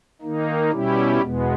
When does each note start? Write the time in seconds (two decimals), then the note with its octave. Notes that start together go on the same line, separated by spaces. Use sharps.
0.21 D#3 A#3 D#4
0.71 B2 G3 C#4 E4 G4
1.22 E2 B2 G#3 B3